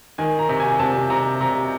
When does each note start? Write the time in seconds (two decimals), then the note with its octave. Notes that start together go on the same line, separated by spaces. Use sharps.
0.18 D#3 G#5
0.39 A#5
0.49 C3
0.60 G#5
0.79 C3 A5
1.10 C3 A#5
1.40 C3 A#5